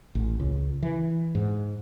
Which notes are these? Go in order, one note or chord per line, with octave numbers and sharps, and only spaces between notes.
A1
C#2
E3
G#2